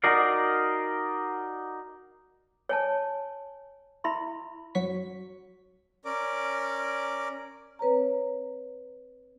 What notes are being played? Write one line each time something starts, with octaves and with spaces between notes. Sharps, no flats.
D#4 F#4 A#4 D5 F5
C#5 G#5 A5
E4 E5 B5 C6
F#2 F#3 C#6 B6
C#4 A#4 D5 D6
C4 B4 C#5 A#5